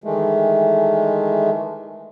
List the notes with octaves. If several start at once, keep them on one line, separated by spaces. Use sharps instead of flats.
D#3 E3 G#3 A3